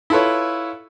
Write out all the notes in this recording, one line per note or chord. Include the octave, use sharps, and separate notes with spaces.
E4 F4 A4 B4 C#5